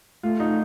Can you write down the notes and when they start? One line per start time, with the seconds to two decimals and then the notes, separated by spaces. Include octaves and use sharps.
0.23 A3 F4
0.40 D#4